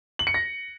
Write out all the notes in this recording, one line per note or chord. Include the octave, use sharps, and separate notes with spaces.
F#7
C#7
A#6